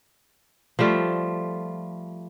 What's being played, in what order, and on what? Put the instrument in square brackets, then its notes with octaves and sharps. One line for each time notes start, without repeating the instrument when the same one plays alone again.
[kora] F3 G3 A3 F4